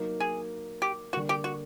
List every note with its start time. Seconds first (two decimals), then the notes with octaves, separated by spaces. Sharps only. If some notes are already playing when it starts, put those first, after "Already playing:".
Already playing: F#3 A#3 D#4
0.20 G#4
0.82 G4
1.13 D3 G3 A#3 F#4
1.29 G4
1.44 F#4